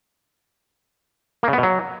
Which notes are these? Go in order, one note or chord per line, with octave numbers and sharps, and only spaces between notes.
A#3
C#3
B3
B2
F#3